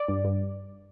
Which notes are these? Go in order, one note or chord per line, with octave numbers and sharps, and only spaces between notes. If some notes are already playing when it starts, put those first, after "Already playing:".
Already playing: D5
G2
G2